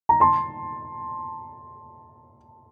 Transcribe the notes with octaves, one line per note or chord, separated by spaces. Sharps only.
A#5
A5 C6